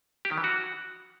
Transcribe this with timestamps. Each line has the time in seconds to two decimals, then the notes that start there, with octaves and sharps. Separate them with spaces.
0.25 G4
0.31 D#3
0.38 E3
0.44 F#4